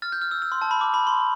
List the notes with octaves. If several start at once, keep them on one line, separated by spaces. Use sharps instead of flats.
F6 A6
G6
F6
E6
E6
C6
A5
B5
D6
B5
C6